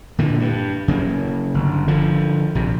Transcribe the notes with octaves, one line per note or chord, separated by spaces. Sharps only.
A#2 D3 E3
G2
C#3 F#3 A#3
G1
D3 F3
A#1 C3